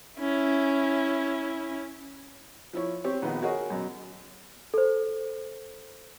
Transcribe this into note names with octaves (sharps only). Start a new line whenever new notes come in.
C#4 E4
F3 E4 C#5
C4 G4 C#5
A#1 D#3 B3
F#4 G#4 A#4 C#5 D#5
F#2 B2
A4 C5